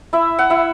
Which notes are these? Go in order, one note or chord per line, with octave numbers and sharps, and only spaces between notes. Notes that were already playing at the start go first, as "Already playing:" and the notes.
E4 E5
F#5
E4 E5